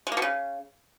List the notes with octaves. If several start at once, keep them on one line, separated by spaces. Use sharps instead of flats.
G#3
A#3
B2
C#3